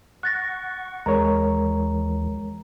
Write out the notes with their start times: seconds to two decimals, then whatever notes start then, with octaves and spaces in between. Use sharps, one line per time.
0.23 F#5 C#6 F#6 A6 A#6
1.06 D#2 E3 G#3 A#4 C#5 A#5